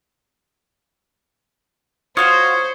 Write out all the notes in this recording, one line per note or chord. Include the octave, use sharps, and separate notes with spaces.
F4 F#4 C5 C#5 F5 D#6